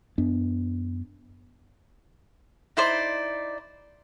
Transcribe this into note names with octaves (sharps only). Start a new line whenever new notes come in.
F#2 B3 D4
D#4 E4 C5 D5